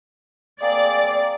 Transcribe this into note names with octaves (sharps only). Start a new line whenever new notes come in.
A#3 C4 G#4 D5